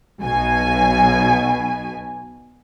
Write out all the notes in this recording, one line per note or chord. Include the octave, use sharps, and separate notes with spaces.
B1 B2 G#5